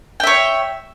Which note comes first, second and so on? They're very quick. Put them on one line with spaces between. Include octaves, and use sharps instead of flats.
G5 E5 C#5